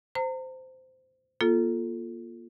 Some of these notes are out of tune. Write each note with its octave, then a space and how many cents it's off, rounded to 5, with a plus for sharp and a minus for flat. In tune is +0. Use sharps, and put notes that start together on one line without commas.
C5 -15 A#5 -35
A#3 +30 F4 +0 A4 +0